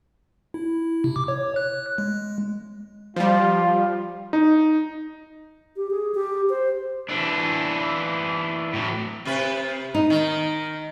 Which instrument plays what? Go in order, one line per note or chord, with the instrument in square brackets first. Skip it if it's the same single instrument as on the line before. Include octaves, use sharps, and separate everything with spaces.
[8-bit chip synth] E4
C3
D6
C#5
F#6
G#3
[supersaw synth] F3 G3 [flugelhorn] F4
[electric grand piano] D#4
[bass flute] G4
G#4
G4
C5
[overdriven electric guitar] E3 D4
A2 F#3
[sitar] C3 B4
[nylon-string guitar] D#4
[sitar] D#3